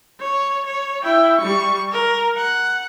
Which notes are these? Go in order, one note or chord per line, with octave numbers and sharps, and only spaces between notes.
C#5
C#5
E4 G5
G3 C#6
A#4
F#5